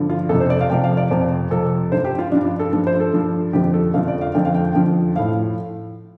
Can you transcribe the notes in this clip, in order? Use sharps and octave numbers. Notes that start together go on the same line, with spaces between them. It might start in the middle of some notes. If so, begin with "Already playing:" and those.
Already playing: G2 D3 F3
F4
F2 C3 F3 A4
C5
D5
F5
F2 C3 F3 G5
F5
D5
F2 C3 F3 C5
F2 C3 F3 A4
G2 F3 C5
G4
F4
G2 F3 D4
F4
A4
G2 F3 A4
C5
A4
G2 F3
F2 D3 F3 G4
A4
F2 D3 F3 F5
D5
F5
F2 D3 F3 G5
F5
G5
G5
F2 D3 F3
A2 F3 F5